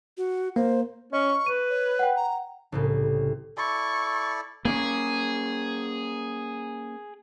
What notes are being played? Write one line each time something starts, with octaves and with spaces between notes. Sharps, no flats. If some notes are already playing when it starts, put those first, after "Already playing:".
F#4
A#3 C5
C#4 D#5 C#6
B4 D#7
C#5
F#5 G5
A#5
C2 A2 C#3
E4 A4 D5 C#6
A#3 B3 C#4 G#4